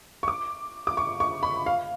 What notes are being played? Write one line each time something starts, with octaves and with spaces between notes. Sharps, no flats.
C#6
D6
D6
C#6
C#6
B5
F5